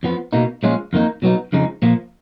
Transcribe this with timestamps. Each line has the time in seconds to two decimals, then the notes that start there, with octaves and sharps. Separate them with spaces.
0.03 F2 F3 B3
0.33 B2 A#3 D#4
0.63 A#2 F3 G#3 C#4 F4
0.93 F2 D#3 A#3 D#4
1.22 B2 F#3 B3 D#4
1.53 F2 C#3 F3 G#3 D#4
1.82 A#2 F3 A#3